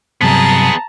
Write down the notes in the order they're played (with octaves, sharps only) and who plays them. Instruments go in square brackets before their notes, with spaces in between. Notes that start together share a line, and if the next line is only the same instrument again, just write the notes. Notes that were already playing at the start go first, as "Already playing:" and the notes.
[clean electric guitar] G2 C3 F#3 [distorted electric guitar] B3 G#4 [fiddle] A5 A#5